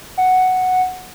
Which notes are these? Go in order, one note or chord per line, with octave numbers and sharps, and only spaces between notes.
F#5